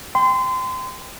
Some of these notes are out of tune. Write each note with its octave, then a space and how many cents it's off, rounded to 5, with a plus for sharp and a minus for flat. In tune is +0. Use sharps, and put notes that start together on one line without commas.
G5 +15 C6 -30